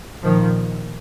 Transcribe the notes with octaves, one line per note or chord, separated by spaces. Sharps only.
A#2 D#3 F3